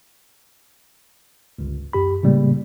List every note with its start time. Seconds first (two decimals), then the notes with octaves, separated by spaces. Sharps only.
1.59 G1 C#2
1.93 F#2 G4 B5
2.23 A2 C#3 G3 G#3 A#3